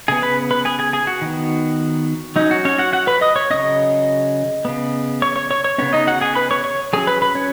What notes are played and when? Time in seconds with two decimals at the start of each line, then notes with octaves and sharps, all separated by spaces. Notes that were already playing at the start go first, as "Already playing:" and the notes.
0.08 C#3 B3 G#4 G#5
0.22 B4 B5
0.51 B4 B5
0.65 G#4 G#5
0.79 G#4 G#5
0.93 G#4 G#5
1.07 F#4
1.21 D#3 B3
2.36 F#3 C#4 D#4
2.51 F#4
2.65 C#4 C#5
2.78 F#4 F#5
2.93 F#4 F#5
3.07 B4 B5
3.21 D#5 D#6
3.36 C#5 C#6
3.50 C#3 F#3 C#4 D#5 D#6
4.65 C#3 B3
5.22 C#5 C#6
5.36 C#5 C#6
5.51 C#5 C#6
5.64 C#5 C#6
5.78 C#3 B3 C#4 C#5
5.93 D#4 D#5
6.07 F#4 F#5
6.21 G#4 G#5
6.35 B4 B5
6.51 C#5 C#6
6.64 C#5 C#6
6.93 F#3 C#4 G#4 G#5
7.07 B4 B5
7.22 B4 B5
7.35 C#4 C#5